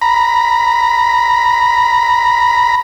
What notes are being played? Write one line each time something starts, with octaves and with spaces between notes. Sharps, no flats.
A#5 B5